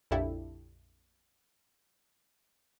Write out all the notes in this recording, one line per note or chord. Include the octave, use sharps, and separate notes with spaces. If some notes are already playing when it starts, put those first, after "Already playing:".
A#1 F2 D4 E4 G4 A4